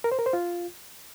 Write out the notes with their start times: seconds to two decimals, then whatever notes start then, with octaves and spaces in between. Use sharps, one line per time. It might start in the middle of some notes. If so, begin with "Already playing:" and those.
0.04 A#4
0.12 C5
0.19 A#4
0.26 C5
0.33 F4